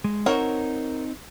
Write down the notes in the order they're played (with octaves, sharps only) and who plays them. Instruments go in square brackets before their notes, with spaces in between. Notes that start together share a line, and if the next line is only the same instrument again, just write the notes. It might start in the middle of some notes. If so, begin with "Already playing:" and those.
[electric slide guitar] G#3
[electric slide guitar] C4 D#4 [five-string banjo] F#4 A#4 C#5